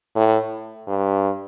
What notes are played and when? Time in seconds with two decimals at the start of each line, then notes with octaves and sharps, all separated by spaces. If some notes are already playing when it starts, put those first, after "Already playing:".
0.16 A2
0.88 G2